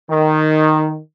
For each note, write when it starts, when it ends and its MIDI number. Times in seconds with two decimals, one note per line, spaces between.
0.11 0.99 51